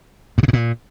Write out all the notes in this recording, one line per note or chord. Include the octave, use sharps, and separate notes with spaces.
G2
C3
G#2
A#2